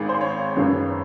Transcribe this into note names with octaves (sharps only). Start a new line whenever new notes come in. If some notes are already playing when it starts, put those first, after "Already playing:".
Already playing: G#1 G#2 D#3 G#4
C5
C#5
F#1 F#2 D#3 G#3 B3